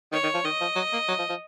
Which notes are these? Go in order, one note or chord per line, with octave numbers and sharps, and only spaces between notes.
D#3 C#5
D#3
F3
D#3 D#5
F3
F#3
A#3
F#3
F3
F3